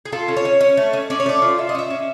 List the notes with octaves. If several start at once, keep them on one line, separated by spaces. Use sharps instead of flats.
G#4
F4 A4
C#4
C#5
C#4
C#4
A3
C#4
C#4 D5
C#5
A3 D5
F4
F4 E5
D#5
C#4 E5
C#4